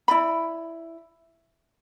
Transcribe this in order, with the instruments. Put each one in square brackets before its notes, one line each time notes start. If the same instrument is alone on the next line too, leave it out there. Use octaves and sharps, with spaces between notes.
[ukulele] E4 D5 B5